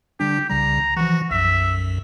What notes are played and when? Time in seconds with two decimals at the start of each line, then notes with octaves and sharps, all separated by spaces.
0.20 D3 G3 D4 G4
0.50 C2 C#3 G3 A#5
0.97 E3 F3 F#4
1.31 B1 F#2 E5